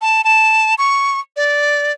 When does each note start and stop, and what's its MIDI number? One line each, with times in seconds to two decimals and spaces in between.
0.02 0.24 81
0.24 0.75 81
0.78 1.20 85
1.36 1.92 74